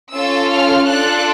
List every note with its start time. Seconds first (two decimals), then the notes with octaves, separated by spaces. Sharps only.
0.12 C#4 F4 A4 E6
0.49 F6
0.86 D4 F4 A4 F#6